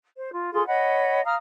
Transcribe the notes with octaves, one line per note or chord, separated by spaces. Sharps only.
C5
F4
F4 G#4 A4 C6
C#5 D#5 F#5 B5
F5 A#5 D#6 F6